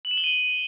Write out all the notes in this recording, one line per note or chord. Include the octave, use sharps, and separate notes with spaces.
F#7
E7
G7
D#7